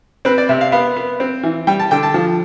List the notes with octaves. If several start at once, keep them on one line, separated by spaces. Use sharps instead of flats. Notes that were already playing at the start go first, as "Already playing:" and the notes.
C4 B4
D5
C3 E5
F5
B3 F5
B3
C4
E3
G3 G5
A5
D3 G5
A5
F3